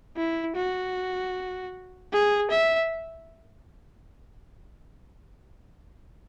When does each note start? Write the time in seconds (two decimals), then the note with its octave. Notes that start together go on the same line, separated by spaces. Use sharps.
0.17 E4
0.56 F#4
2.13 G#4
2.51 E5